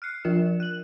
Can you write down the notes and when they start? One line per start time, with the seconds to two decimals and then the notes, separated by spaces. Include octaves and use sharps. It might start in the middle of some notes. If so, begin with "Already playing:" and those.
0.02 F6 F#6 C7 C#7
0.25 F3 F4 A#4 E7
0.60 F#6 F#7